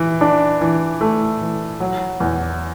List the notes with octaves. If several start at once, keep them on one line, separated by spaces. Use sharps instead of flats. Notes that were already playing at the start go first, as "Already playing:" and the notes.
Already playing: E3
D4
E3
A3
E3
F#3
E2